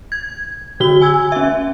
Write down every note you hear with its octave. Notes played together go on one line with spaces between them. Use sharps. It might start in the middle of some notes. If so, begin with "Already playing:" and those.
G#6
D3 F#4 G7
G#5 E6 G#6
C#4 E5